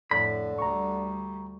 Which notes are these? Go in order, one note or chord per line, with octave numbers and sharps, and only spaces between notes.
F2 A2 D3 B5
D2 G3 A#5 C#6